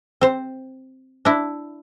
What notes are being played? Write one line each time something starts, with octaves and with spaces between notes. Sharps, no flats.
C4 C5
D4 E4